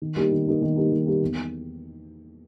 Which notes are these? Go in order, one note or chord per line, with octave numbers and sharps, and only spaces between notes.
D#3
G3 A#3 D#4 G4
D#3
G3 A#3 D#4 G4
D#3
G3 A#3 D#4 G4
D#3
G3 A#3 D#4 G4
E2